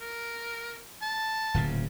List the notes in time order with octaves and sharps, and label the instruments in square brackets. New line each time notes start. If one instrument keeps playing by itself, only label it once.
[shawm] A#4
A5
[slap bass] D1 A#2 C#3